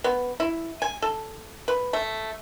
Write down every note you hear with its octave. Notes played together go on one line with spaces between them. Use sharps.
B3
E4
G#5
A4
B4
A3